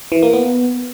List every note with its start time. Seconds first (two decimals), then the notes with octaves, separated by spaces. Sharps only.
0.12 E3
0.23 A#3
0.33 B3